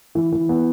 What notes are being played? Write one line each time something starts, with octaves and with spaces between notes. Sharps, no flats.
E3
E3
B3